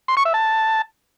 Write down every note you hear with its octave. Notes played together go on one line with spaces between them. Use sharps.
C6
C#6
E5
A5